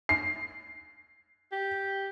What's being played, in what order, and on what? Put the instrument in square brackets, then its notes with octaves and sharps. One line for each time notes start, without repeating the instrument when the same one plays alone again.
[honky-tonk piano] C7
[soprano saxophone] G4